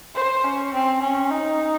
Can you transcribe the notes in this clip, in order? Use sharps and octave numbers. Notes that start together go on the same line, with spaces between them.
C5
C#4
C4
C#4
D#4